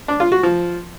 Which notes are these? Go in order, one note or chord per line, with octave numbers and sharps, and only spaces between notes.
D4
F4
F#4
F3